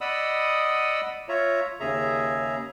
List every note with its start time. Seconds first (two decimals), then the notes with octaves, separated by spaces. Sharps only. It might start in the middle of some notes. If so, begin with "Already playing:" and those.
0.01 D5 D#5 F#5 B5 D#6 E6
1.29 F4 C#5 E5 A#5
1.80 D#2 C#3 G#4 E5 A#5